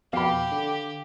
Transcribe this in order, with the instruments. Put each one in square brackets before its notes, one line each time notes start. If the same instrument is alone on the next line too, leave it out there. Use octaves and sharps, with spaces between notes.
[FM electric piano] F2 B2 [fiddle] G4 [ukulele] F5 B5
[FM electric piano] D3